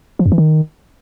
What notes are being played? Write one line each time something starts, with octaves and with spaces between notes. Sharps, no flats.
F3
F#2
E3
D#3